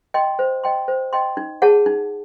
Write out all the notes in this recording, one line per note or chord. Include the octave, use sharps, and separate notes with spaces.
D#5 G5 C6
C5
D#5 G5 C6
C5
D#5 G5 C6
D#4
G#4 C#5 F#5 A5
D#4